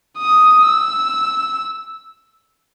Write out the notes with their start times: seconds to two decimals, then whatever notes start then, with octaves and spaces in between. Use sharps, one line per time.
0.18 D#6
0.66 E6